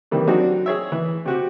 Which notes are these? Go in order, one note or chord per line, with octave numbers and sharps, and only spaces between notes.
C3 D#3 E3 G3 A#3
F#3 C4 D4 D#4 F#4
G#4 C#5 E5
E3
C3 F#4 G4